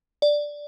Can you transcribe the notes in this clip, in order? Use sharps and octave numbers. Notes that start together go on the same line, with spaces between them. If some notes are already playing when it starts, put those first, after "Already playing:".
D5